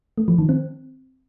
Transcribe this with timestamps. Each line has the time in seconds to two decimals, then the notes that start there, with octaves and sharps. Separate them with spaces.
0.18 A3
0.28 F3
0.38 D#3
0.49 C4